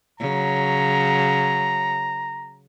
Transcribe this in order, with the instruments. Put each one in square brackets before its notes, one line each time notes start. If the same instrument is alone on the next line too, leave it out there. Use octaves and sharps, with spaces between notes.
[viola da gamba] C#3 F#3 [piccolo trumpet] A#5